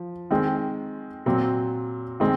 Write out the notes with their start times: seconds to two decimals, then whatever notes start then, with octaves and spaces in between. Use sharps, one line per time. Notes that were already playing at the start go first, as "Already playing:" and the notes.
Already playing: F3
0.31 D#3 G#3 C4
1.26 A#2 F#3 C4
2.20 D#3 G#3 C4